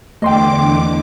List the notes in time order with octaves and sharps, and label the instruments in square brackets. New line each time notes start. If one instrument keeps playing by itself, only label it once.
[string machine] E2 D3 D6 [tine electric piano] A3 C6 [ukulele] D#5 G5